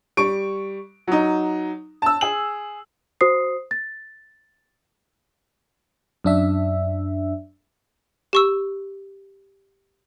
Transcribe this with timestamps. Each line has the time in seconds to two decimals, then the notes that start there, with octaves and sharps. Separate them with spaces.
0.17 G3 C#6 D7
1.08 F#3 D#4
2.02 A5 E6
2.21 G#4 F#7
3.21 F#4 C5 D#6 C7
3.71 A6
6.24 F#2 D4 E5
8.33 G4 C#6 E6